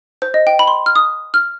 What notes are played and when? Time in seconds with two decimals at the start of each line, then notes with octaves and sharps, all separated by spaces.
0.22 C5
0.34 D#5
0.47 G5
0.59 B5
0.67 C6
0.86 F6
0.96 D#6
1.34 F6